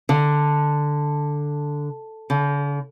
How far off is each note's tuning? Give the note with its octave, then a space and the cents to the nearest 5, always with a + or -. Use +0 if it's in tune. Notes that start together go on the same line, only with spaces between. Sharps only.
D3 +0
D3 -45